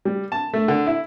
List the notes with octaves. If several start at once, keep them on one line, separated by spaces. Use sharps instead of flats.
G3
A5
A3
D3
E4